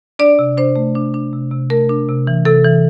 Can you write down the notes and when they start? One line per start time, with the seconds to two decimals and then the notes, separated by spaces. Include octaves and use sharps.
0.19 D4 D5
0.39 C3
0.57 D4 C5
0.76 A3
0.95 D4
1.14 D4
1.33 C3
1.51 C3
1.70 A3 A#4
1.89 D4
2.09 C3
2.27 E3
2.45 C3 A4
2.64 E3